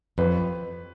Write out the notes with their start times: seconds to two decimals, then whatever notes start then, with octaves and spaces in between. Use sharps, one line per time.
0.18 F2 B4